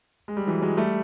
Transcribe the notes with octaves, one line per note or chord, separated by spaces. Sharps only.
G#3
G3
E3 F#3
F#3 G#3
G3 A3